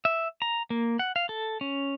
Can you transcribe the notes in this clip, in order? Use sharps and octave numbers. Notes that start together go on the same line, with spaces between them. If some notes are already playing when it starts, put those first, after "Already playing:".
E5
A#5
A#3
F#5
F5
A4
C#4